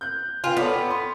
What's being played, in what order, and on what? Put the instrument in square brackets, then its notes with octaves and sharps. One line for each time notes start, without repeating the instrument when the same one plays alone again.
[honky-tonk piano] F#6 G6
[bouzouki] F4 [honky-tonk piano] B4 G5 G#5
[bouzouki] B3 [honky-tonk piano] A4 C#5 D5
[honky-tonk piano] C6